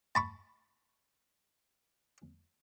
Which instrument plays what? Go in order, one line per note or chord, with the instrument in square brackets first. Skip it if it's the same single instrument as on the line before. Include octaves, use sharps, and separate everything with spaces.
[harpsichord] A5 B5 C#6